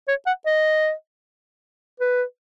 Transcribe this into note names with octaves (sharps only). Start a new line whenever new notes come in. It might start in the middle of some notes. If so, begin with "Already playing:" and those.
C#5
F#5
D#5
B4